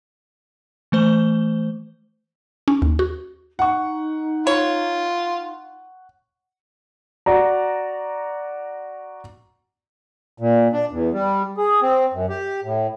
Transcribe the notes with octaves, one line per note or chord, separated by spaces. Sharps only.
E3 A3 C5 G7
C#4
D#2
F#4
D#4 F#5 C#6
F4 C#5
F#4 D5 A#5
A#2
D4
E2
G3
G#4
C4
F#2
G4
A2